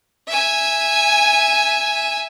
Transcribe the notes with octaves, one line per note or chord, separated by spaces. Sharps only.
E5 G#5